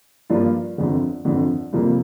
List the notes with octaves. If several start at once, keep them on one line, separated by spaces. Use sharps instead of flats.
G2 F3 A#3 D4 F4
G1 F2 D3
G1 F2 D3
F2 C3 G3 A#3 F4